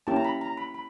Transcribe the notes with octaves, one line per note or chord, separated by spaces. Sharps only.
A#3 C#4 E4 G4 A5
A#5
B5
A#5
B5
B5